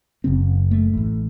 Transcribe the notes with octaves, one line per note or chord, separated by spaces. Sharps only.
F#1 F#2 C#3 C4
A3
A1 A2